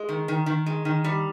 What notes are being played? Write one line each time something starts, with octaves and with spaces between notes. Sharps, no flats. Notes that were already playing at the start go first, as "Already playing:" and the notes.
Already playing: G#3
D#3
D#3
D#3
G#3
D#3
G3